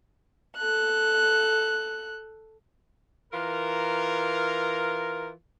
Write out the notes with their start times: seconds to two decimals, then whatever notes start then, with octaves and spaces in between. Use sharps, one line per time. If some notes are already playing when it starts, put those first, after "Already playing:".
0.57 A4 F#6
3.33 E3 F4 A#4